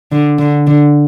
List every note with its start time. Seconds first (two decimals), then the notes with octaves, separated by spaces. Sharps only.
0.12 D3
0.39 D3
0.67 D3